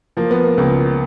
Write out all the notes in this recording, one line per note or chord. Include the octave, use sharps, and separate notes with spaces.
F3 A#3
B3
A#3
C#2 A#3